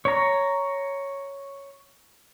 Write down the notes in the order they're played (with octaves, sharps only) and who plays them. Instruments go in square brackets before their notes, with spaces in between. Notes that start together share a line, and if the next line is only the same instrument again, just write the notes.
[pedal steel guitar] C#5 A#5